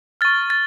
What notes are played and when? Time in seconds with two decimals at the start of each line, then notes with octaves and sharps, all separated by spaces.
0.21 C#6 F6 A6
0.50 A6